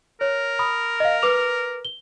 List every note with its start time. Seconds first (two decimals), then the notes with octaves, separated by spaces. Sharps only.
0.21 A#4 C#5
0.59 B5 D#6
1.00 D#5 F5
1.22 B4 D6 F7
1.85 G7